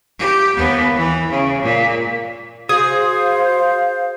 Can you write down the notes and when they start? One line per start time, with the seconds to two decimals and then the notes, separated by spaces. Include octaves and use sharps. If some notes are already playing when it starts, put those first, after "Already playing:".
0.19 G4
0.56 D#2 B3
0.96 E3
1.30 C#3
1.63 A#2
2.69 F#4 G#4 C5 F5 D#6